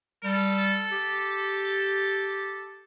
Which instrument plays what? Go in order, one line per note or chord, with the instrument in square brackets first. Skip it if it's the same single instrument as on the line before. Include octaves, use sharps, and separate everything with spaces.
[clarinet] G3 [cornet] A4
[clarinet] G4